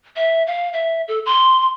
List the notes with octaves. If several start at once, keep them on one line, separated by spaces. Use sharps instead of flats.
E5
F5
E5
A4
C6